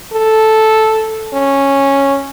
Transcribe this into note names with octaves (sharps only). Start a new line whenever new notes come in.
A4
C#4